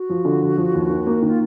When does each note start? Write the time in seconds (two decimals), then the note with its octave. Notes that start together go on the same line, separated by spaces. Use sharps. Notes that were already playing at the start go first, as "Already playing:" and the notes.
Already playing: F#4
0.09 F3
0.25 D3
0.42 F3
0.57 F3
0.74 D#2
0.90 D#3
1.06 A#3
1.22 D#3
1.28 F4